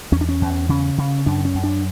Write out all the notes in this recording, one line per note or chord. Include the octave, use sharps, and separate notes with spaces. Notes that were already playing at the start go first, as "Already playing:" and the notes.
E2 C#4
D4
C#4
E2
C#3 C#4
C#3
F#2 D4
C#4
F#2
D4